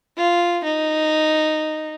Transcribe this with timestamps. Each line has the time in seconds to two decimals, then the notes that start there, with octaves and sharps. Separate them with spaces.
0.17 F4
0.64 D#4